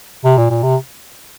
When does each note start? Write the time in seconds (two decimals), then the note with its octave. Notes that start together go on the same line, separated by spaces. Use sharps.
0.24 C3
0.37 A#2
0.50 A#2
0.63 C3